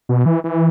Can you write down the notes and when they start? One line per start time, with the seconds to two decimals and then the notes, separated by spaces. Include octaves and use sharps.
0.09 B2
0.26 E3
0.44 E3